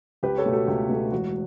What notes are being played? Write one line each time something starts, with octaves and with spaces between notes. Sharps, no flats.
C#2 G4 B4
A4 C#5
B2 A3
F#4 A4
C#2 G4
B2 A3
E1 F#4